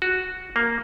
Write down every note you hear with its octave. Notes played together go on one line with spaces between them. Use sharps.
F#4
A#3